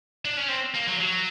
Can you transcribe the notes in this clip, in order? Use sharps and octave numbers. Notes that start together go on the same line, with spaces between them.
D4
C#4
C4
A#3
F#3
F#3